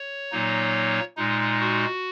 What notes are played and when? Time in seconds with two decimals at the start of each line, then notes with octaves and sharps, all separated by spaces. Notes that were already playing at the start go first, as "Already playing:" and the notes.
Already playing: C#5
0.32 A#2 F#3 A#3 D#4
1.17 A#2 G#3 D#4
1.60 F#4